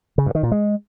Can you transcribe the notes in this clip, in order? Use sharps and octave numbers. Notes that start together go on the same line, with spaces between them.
C#3
G2
D#3
A#2
G#3